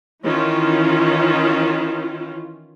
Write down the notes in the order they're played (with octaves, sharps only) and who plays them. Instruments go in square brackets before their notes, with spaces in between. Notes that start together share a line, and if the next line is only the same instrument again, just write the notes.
[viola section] D#3 E3 C#4 F4